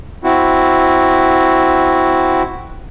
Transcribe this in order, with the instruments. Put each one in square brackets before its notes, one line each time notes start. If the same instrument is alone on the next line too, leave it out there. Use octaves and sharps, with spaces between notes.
[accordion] C4 E4 F#4